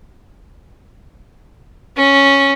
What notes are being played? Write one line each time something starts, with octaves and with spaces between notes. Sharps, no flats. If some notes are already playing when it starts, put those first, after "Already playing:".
C#4